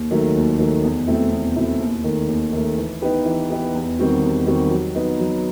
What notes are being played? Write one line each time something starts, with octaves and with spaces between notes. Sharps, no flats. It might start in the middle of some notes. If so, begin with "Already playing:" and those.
Already playing: D#2
D#3 F#3 A3
D#2
D#3 F#3 A3
E2
B2 A3 C4 E4
E2
B2 A3 C4 E4
D#2
D#3 A3
D#2
D#3 A3
E3
B3 D#4 G4 B4
E3
B3 D#4 G4 B4
E2
D#3 G3 C4 F#4
E2
D#3 G3 C4 F#4
F#3
B3 D#4
F#3